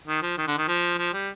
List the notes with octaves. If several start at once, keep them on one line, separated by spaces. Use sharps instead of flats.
D#3
F3
D#3
D3
D#3
F3
F3
G3